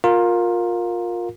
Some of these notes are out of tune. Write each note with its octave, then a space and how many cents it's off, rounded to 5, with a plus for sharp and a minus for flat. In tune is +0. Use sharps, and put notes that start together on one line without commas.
F4 +20 A#4 +0